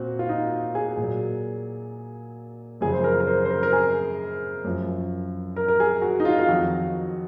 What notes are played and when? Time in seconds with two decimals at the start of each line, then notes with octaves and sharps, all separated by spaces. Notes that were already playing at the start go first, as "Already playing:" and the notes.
Already playing: A#2 C4 F#4
0.19 F4
0.29 D#4
0.75 G#4
0.97 A#2 F#3
2.81 F#2 C#3 F3 G#4
2.93 C5
3.04 A#4
3.20 A#4
3.27 C5
3.45 C5
3.50 A#4
3.63 A#4
3.72 G#4
4.64 F#2 F3
5.56 A#4
5.68 A#4
5.80 G#4
6.02 F#4
6.20 D#4
6.25 F4
6.39 F4
6.48 F2 D#3 F#3 F#4